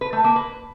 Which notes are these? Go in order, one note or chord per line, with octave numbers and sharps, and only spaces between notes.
B4
A3
A#3
B4